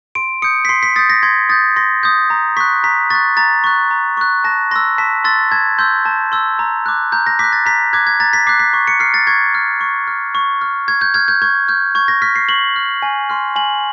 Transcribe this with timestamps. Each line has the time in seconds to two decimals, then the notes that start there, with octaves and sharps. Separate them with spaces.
0.15 C6 D7
0.42 D#6 G6 C#7
0.65 B6
0.69 C6 C7
0.83 B6
0.96 D#6 G6 A6
1.10 A#6
1.23 C6 G#6
1.49 D#6 G6 A6
1.76 C6 A#6
2.03 D#6 G6
2.30 A#5
2.57 C#6 F#6 B6
2.84 A#5 B6
3.10 C#6 F#6 A6
3.37 A#5 A6
3.64 C#6 F#6
3.91 A#5
4.17 C#6 F#6
4.44 A5 A#6
4.71 C6 E6 A#6
4.98 A5 B6
5.24 C6 E6 A6
5.52 A5 G#6
5.78 C6 E6 G6
6.05 A5
6.32 C6 E6
6.59 A#5
6.86 D6 F#6
7.12 A#5 G6
7.26 A#6
7.39 D6 F#6 B6
7.53 A6
7.66 A#5 B6
7.93 D6 F#6 G#6
8.07 G#6
8.20 A#5 A6
8.33 B6
8.47 D6 F#6 C7
8.60 B6
8.74 C#6
8.87 C#7
9.00 F6 C7
9.14 A6
9.27 C#6 G#6
9.55 F6
9.81 C#6
10.07 F6
10.35 C#6
10.61 F6
10.88 C#6 G#6
11.01 G6
11.14 F6 G#6
11.28 G6
11.42 C#6 G#6
11.68 F6 G6
11.95 C#6 G#6
12.08 A#6
12.22 F6 B6
12.36 C7
12.49 C#6 F#7
12.76 F6
13.02 G#5
13.29 C6 F6
13.56 G#5 F#7